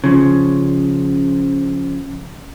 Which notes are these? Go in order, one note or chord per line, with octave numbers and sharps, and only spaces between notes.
C#3 F3